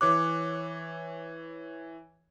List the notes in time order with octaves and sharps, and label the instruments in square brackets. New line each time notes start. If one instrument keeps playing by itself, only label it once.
[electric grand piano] E3 C#5 F#6 [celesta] D6